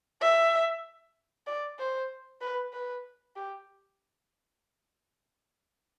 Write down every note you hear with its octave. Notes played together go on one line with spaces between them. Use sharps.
E5
D5
C5
B4
B4
G4